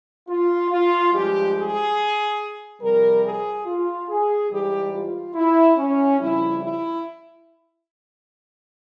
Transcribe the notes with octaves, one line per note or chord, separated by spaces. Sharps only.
F4
F4
G2 F3 G#3 G4
G#4
F2 C3 G3 A#4
G#4
F4
G#4
G#2 E3 G3 G4
F4
E4
C#4
F2 C#3 G3 E4
E4